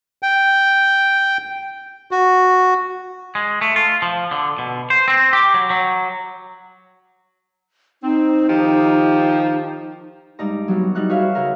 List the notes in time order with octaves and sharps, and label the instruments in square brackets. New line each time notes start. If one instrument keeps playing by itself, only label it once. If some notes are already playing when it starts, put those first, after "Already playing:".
[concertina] G5
F#4
[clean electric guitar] G#3
A3
F4
F3
D3
B2
C5
C4
G4
F#3
F#3
[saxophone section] C4 [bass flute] D#4
[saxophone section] D#3 F3 G4
[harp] G2 G#3 D#4 D5 A#5
F#3 G3 B3
G3 D#4 E4 F#6
F#4 G#4 B4 C#5 E5 F5
C#3 G#4 A#4